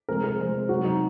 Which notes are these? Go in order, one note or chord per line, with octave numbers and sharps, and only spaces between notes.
C3 F3 G#3 A#4
A#4
C3 F3 G#3 C5
C5
C3 F#3 F#4
D#4